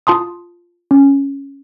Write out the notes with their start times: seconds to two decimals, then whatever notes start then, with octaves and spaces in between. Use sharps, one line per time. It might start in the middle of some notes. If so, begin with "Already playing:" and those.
0.07 F4 A5 C6 D#6
0.91 C#4